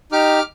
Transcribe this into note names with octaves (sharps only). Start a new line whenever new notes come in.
D#4 G4 D6 F6